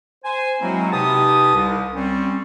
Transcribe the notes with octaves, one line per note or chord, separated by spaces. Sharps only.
C5 G#5
F#3 G#3 A#3 C4 E4 F#4
C3 D#4 G4 B4 A5 D#6
C2
G3 C4 C#4